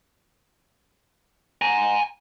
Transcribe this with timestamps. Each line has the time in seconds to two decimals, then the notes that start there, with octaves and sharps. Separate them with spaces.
1.62 G#5 A#5